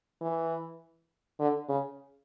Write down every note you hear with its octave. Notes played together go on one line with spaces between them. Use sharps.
E3
D3
C#3